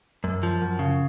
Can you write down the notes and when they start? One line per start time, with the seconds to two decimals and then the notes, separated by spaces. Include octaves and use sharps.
0.24 F#2
0.43 F3
0.62 F#2
0.79 C#3